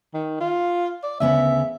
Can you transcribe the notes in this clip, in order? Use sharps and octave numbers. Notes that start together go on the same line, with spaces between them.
D#3
F4
D5
D2 C#3 B3 E5